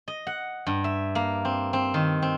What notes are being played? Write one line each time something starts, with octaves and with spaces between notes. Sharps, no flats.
D#5
F#5
G2
E5
A#3
C4
C4
D#3
C4